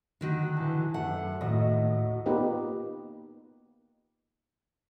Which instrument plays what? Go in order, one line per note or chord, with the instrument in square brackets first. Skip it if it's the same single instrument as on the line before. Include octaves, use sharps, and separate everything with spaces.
[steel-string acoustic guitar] D3 D#3 F#4
[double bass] E3 [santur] A5
[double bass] F#2 [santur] A3 [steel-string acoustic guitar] F#5
[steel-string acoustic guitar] D#2 [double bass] A2 [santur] F#4 C#5 D#5
[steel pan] A#3 B3 D#4 F4 G4 B4